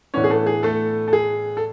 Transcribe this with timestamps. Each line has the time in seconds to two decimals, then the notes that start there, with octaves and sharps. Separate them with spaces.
0.14 A2 E3 B3 C#4 D4 C#5
0.24 G#4
0.30 A3 A4
0.46 G#4
0.63 A3 A4
1.08 A4
1.13 G#4
1.57 A4